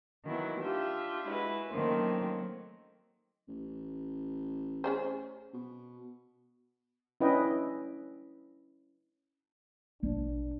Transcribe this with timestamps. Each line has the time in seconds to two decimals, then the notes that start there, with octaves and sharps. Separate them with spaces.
0.25 D#3 E3 F#3 B3 E4
0.59 D4 F4 G4 E5
1.26 G#3 E4 F#4 B4
1.69 D#3 F#3 A3 A#3 C4 C#4
3.48 A1
4.84 C#4 G#4 C5
5.53 B2
7.21 C#4 D4 E4 B4 D#5 G5
10.03 A#1 B2 D4